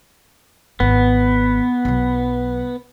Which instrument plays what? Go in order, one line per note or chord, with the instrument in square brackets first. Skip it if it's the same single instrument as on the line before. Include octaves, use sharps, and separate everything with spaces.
[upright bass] G#1 [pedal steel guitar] B3
[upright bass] B1 F#3